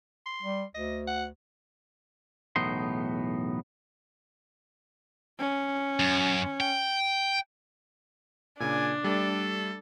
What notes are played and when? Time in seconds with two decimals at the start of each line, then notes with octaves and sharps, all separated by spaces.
0.26 C6
0.43 G3
0.75 D2 D#5
1.07 F#5
2.56 B1 E2 A2 B3 D#4 C6
5.39 C#4
6.00 F#2
6.60 G5
8.60 A#2 C#3 D4 G#5
9.04 G3 A3 A4